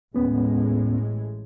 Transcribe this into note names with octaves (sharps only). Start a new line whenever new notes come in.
A1 D#2 A2 G#3 B3 C#4